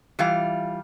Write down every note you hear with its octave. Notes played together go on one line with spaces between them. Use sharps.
E3 G3 F4 F5